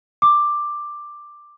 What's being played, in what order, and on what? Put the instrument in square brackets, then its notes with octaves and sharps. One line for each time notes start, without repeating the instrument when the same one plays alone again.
[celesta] D6